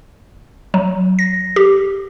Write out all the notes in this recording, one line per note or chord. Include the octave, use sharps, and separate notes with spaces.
F#3
A#6
G4